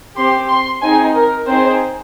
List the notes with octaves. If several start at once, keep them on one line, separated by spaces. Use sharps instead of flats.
C4 G4 C6
C6
C4 D#4 G#4 G#5
A#4
C4 D#4 G#4 C5